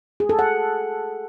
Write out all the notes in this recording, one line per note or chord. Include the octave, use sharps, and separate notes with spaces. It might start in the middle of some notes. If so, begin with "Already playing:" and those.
G#4
A4
F#5